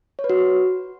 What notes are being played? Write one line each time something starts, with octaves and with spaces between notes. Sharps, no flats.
C#5
B4
F#4